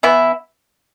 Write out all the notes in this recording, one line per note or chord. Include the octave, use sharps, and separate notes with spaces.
E3 B3 E4